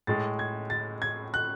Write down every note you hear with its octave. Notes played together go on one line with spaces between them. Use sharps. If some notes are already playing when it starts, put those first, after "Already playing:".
A2 G#3 A6
G#6
A6
G#6
F#6